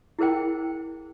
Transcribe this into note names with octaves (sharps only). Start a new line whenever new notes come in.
E4 G#4 A#4 C5 G5